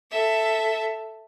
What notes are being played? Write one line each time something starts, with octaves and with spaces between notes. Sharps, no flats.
A4 E5